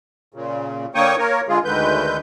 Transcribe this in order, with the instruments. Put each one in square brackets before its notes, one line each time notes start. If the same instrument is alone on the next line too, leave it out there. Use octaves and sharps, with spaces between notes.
[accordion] A#2 C#3
D3 A#3 C#5 G5 C#6 D#6
A#3 A#4 C#5
D3 G#3 F4 G#4
D2 D3 D#3 G#3 B4 G6